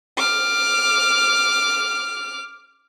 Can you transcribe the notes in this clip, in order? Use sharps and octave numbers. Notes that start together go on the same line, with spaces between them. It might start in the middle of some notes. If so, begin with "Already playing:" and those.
D6 F6